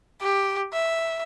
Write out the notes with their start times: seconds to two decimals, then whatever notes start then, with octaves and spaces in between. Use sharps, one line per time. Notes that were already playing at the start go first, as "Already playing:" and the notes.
0.22 G4
0.73 E5